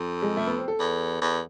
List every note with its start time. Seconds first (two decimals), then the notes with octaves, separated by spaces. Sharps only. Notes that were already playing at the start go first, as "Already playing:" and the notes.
Already playing: F2
0.22 G#3
0.37 A3
0.47 B3
0.58 C4
0.68 A4
0.80 E2
1.22 E2